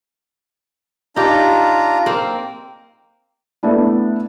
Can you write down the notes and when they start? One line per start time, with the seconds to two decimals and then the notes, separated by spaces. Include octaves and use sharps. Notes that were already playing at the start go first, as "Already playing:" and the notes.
1.16 D4 D#4 F4 G4 A#5
2.06 A#3 C4
3.63 A3 B3 D4 E4